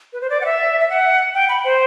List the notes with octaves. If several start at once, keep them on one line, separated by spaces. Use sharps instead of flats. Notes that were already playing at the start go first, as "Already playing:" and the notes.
B4
C5
D5
F#5
E5
E5
F#5
G5
B5
C5